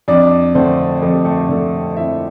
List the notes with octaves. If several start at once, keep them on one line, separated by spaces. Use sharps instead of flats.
F2 D4 D5
D3 A3 C4 C5
F2 A4
G4
A3 A4
D3 A3
F2 E4 E5